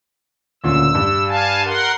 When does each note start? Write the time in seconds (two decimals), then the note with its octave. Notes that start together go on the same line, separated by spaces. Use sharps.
0.64 D2 A#2 C#3 E6
0.95 G2
1.28 F5 G#5 A5
1.65 A#4 F#5 C6